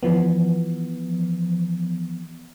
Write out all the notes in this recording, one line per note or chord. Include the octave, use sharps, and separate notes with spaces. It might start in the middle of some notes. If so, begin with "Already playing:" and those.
E3 F3 B3